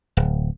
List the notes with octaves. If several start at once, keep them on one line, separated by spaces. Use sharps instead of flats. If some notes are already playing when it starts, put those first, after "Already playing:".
D1